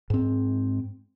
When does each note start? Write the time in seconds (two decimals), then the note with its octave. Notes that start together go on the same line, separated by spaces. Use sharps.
0.10 G#2 C4